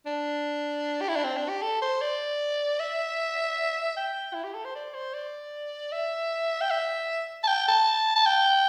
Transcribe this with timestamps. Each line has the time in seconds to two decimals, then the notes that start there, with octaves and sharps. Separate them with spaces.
0.06 D4
1.01 G4
1.09 E4
1.16 D4
1.24 C4
1.37 D4
1.49 G4
1.62 A4
1.82 C5
2.01 D5
2.80 E5
3.97 G5
4.34 E4
4.44 G4
4.54 A4
4.65 C5
4.75 D5
4.94 C5
5.14 D5
5.92 E5
6.61 G5
6.70 E5
7.44 A5
7.48 G5
7.68 A5
8.16 A5
8.26 G5